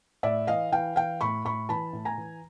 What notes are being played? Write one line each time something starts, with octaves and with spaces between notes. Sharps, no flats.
A2 D5 E5
E3 D#5 F5
E3 F5 G5
E3 F5 G5
A2 B5 C#6
A2 B5 C#6
E3 A5 B5
A2
G#5 A#5
E3